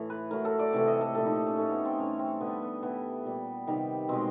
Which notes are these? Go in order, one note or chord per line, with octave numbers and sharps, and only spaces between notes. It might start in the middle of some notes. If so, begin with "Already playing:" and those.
Already playing: A2 E3 A3
B4
A2 F#3 A3 A#4
A4
D5
C3 E3 A3
D#5
A4
A#2 F3 A3 A4
D#4
C#4
A2 F3 A3 C#4
B3
C4
A2 E3 G3 C#4
C4
D3 G3 B3
B3
A2 E3 G3 B3
A#2 G3
C3 D#3 G3
B2 G#3 C4